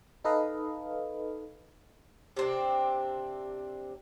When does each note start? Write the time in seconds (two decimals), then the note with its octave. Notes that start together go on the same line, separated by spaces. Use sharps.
0.24 D#4 A4 B4 D#5 F5
2.37 C3 C4 D4